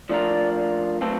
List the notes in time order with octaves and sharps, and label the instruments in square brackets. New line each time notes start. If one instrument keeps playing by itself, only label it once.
[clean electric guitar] F3 A3 D4 F4 A#4 [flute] D5
[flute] D5
[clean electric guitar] F#3 A3 C4 F4 A4 [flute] B4